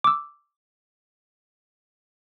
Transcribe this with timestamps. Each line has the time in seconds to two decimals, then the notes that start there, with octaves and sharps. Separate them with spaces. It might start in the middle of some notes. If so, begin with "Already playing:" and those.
0.04 D6 E6